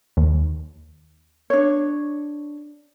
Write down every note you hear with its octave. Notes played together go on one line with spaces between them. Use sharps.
D#2
D4 C#5